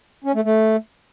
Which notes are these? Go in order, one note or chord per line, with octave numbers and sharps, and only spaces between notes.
C#4
A3
A3